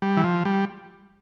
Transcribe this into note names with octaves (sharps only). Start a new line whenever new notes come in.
G3
E3
F3
G3